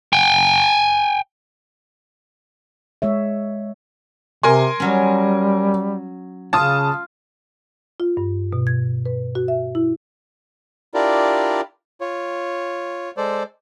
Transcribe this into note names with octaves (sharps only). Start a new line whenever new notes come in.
G5 G#5
G#3 C#5 E5
C3 A#4 G#5 C6
F#3 G3 C#4
C#3 F4 A5 D#6
F4
G2
B2
G#6
B4
F#4
E5
E4
D4 E4 F4 G4 A#4 D5
F4 C#5
G#3 A4 C5 D5